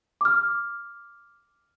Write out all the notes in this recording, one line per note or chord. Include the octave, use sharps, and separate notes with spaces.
D6 F6